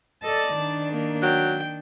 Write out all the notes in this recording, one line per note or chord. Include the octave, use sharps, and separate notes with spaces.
A4 D5 D#5 A5
D#3 D4
A#3
F#3 G5